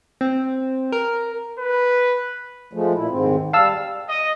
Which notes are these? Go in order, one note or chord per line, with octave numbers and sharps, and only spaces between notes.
C4
A#4
B4
F3 G#3 A3
A#2 E4
D#2 G#2 C4
G3 F5 A5 E6
D#5